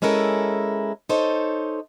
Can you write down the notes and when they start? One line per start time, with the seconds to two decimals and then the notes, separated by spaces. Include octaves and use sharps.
0.02 G#3 C#4 E4 A4 A#4
1.09 D#4 A4 C5 C#5